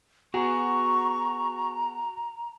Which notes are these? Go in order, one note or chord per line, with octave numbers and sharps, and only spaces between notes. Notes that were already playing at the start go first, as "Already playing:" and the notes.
B3 F#4 G#4 A#5 C#6